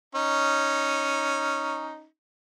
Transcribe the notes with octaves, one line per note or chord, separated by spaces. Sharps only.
C#4 D#4